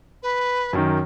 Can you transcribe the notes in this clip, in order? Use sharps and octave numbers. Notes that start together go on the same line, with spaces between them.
B4
F#2 D#3